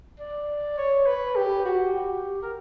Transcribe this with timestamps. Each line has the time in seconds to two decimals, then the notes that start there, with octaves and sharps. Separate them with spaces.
0.20 D5
0.78 C#5
1.06 B4
1.36 G4
1.65 F#4
1.93 G4
2.42 A#4